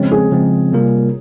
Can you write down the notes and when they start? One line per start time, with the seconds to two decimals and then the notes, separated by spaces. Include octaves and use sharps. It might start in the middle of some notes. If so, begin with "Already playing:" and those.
Already playing: C#3 F3 G#3 C4 C#4
0.12 G#4
0.31 C#3 F3 G#3 C4
0.72 C3 G3 A#3 F4 A#4